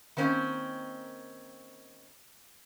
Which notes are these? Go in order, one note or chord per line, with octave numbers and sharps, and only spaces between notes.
D#3 A#3 C4 C#4